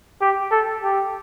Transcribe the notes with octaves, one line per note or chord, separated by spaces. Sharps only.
G4
A4
G4